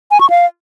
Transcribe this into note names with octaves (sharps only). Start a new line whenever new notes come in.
G#5
C#6
F5